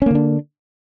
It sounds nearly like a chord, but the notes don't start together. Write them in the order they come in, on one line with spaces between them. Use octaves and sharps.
C#4 A#3 D3 D4